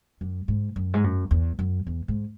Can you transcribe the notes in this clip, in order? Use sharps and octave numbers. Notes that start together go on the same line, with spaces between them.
F#2
G#2
F#2
G#2
F#2
E2
F#2
E2
G#2